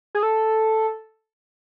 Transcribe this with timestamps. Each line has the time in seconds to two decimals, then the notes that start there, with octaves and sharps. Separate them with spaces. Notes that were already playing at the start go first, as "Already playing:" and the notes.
0.15 G#4
0.23 A4